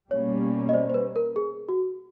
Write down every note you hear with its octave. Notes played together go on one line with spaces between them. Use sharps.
B2 G3 A#3 C#4 C#5
D#5
C5 D5
C5
B4
A#4
G#4
F#4